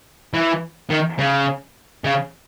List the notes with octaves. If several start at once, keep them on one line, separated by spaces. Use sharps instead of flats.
E3
D#3
C#3
C#3